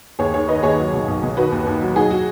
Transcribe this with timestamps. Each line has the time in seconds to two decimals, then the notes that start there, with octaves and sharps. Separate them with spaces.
0.19 D#2 G#4 C#5
0.33 D#3 G#4 C#5
0.48 D#3 B4 D#5
0.63 D#2 G#4 C#5
0.79 F#3
0.93 B2
1.08 B1
1.22 B2
1.37 D#3 F#4 B4
1.52 D#2
1.67 D#2
1.81 F#3
1.96 F#3 D#4 G#4
2.11 F#4